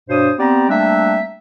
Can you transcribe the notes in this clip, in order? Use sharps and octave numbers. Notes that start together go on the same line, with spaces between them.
G2 B2 D4 C5 C#5 D#6
B3 C4 G4 D5 A#5
G3 A3 A#3 C4 D4 E5